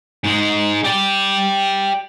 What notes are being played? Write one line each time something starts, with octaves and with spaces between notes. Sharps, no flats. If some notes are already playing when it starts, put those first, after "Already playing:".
G#2 G#3
G4 D5